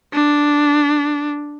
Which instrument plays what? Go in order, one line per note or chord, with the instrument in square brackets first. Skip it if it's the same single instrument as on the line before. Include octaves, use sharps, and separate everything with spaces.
[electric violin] D4